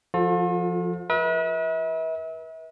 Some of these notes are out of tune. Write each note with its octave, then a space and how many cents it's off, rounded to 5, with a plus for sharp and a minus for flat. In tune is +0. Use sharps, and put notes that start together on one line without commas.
F3 +0 F4 +45 A4 +0
B4 -35 E5 -40